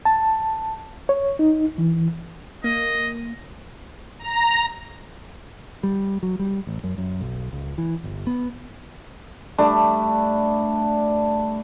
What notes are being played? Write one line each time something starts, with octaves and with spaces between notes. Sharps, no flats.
A5
C#5
D#4
E3
A#3 D#5
A#5
G3
F#3
G3
A1
F#2
F#2
B1
C#2
E3
G1
B3
G3 A3 D4